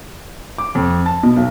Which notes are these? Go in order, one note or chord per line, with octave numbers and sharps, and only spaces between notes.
D6
F2
A5
B2
B1